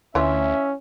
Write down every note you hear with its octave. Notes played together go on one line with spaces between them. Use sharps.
D2 E3 C#4 F4 E5